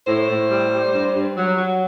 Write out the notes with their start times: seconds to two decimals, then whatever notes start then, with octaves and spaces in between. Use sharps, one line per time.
0.06 A2 C5
0.27 A2
0.50 G3
0.71 G3
0.91 G2
1.14 G2
1.35 F#3
1.56 F#3